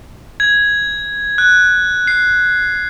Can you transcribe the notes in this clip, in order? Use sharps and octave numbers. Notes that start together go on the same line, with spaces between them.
G#6
F#6
C7